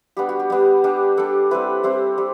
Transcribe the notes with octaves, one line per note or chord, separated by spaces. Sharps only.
G3 B3 D4 G4
F#4
G4
G3 B3 D4
G3 D4
G3 D4 A4
G3 C4 E4 B4
G3 C4 E4 C5
G3